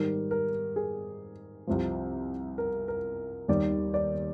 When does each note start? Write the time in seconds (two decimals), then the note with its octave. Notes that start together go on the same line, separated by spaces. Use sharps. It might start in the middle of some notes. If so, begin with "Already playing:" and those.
Already playing: G#2 D#3 G3 A#4
0.31 A#4
0.76 G#4
1.67 C2 C3 F3
2.58 A#4
2.88 A#4
3.48 D#2 D#3 G3 D5
3.94 D5